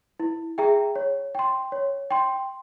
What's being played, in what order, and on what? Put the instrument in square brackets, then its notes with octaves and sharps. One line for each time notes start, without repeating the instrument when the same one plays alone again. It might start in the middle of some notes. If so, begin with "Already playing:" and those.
[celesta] E4
G#4 E5 G5 A#5
C#5
G5 C6
C#5
G5 C6